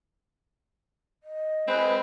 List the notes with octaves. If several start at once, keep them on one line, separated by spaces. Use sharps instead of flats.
D#5
G#3 C4 B4